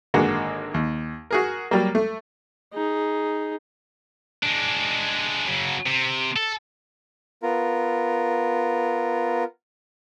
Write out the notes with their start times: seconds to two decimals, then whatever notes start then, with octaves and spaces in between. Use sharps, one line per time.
0.14 G#1 D3 G#3 A#3 F#4 F#5
0.74 D#2
1.31 F#4 G#4 A#4
1.71 F#3 G3 A#3
1.95 A3
2.74 D#4 G#4
4.43 G#3 D4
5.48 C#3 F#3
5.86 C3
6.36 A4
7.43 B3 F4 A#4